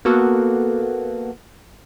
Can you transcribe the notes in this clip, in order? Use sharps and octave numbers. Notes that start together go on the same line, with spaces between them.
A#3 B3 F#4 A4